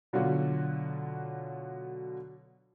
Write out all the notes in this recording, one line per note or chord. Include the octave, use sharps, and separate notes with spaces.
B2 D3 F#3 F4 F#4